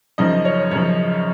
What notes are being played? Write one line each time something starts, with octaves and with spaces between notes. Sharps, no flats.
F#2 C#3 F3 D#4 D#5
C#4 C#5
F#2 C#3 F3 C#4 C#5